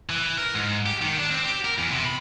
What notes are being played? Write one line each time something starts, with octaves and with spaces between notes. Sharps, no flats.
E3
A#4
G#2
G4
D#3
D4
C4
G4
A#4
E2
C3
B5